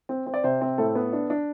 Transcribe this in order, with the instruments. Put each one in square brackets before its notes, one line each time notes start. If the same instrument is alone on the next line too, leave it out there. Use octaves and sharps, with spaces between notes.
[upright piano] C4
C4
D5
C3 C5
C4
A2 A4
B3
D4
D4